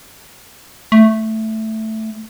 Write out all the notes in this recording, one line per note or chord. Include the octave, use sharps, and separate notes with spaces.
A3